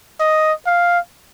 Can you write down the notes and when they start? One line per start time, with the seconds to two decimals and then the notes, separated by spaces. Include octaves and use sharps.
0.20 D#5
0.67 F5